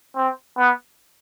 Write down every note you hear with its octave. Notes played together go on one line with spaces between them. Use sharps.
C4
B3